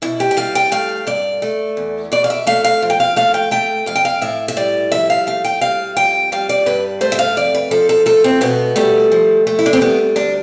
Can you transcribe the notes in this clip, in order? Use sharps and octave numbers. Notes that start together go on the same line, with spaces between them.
B2 E4
G4
G5
G3 F5
G5
A3 F5
G2 D5
A3
E2
B2 D5
F5
E5
A3 F5
F5
F3
G5
F5
A3 F5
G5
A3 G5
F2 F5
G5
F5
A2 E5
E5
G3 D5
F3 E5
F5
A3 F5
G5
G3 F5
F2 G5
G3 F5
D5
G2 B4
A3 C5
E5
F5
F2 D5
B4
F3 A4
A4
A3 A4
C4
B2 B3
G3 A3
F3
A3
E4
D4
C4
G3 B3
D2 D4